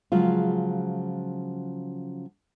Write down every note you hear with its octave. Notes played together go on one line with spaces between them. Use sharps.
C#3 F3 F#3 G#3 F4